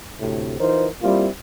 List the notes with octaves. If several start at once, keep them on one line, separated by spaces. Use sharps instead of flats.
D2 A2 C3
E3 D#4 F4 A#4 C5
G3 A#3 C4 E4 F4